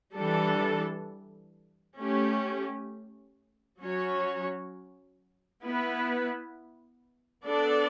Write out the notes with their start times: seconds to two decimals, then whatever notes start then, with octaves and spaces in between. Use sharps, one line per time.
0.16 E3 G3 D4 A4
1.98 A3 C#4 G4
3.81 F#3 C#4 F#4 C#5
5.63 B3 E4 B4
7.46 B3 D4 A4 D5